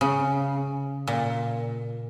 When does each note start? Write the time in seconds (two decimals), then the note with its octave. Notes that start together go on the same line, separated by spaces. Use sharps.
0.01 C#3
1.08 A#2